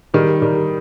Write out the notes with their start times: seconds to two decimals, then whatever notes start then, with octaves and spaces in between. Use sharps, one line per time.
0.14 D#3 G3
0.42 D#3 G3